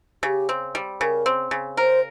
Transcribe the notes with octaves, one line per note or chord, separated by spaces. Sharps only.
C#3 G4
C4
G3
C#3 A#4
C4
C#3
A#4 C5